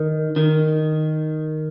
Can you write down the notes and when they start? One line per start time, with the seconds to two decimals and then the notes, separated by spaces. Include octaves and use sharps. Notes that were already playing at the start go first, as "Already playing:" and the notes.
Already playing: D#3
0.36 D#3